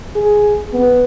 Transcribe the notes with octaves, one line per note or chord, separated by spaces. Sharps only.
G#4
B3